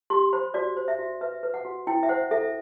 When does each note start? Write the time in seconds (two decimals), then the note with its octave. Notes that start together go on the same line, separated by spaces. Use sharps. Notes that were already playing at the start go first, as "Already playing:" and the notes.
0.10 G4 C6
0.33 C5 B5
0.54 F#4 D5
0.77 C5
0.88 E5
0.99 F#4
1.21 B4 E5
1.43 B4
1.54 F#5
1.65 F#4
1.87 E4 G5
2.03 E5
2.09 C5 F#5
2.31 A4 E5